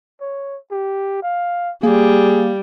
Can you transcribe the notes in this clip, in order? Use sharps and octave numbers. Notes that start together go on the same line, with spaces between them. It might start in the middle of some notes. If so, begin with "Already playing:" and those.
C#5
G4
F5
G3 A#3 G#4